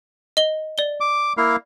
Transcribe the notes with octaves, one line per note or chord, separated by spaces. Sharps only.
D#5 G7
D5 G7
D6
A#3 E4 F5